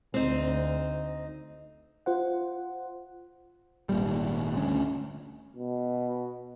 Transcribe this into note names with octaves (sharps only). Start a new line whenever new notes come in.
D2 C4 D#4
F4 C5 F#5
G#1 A#2 G3
D2 C#4
B2